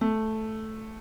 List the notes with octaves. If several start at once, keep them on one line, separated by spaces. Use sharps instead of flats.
A3